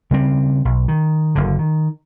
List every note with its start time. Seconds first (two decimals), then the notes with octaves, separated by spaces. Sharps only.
0.11 C#3 G3 C4
0.65 B1
0.88 D#3
1.35 F#1 D3
1.59 D#3